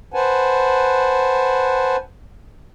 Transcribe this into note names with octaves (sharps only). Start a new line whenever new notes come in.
B4 C5 F#5 G#5 A5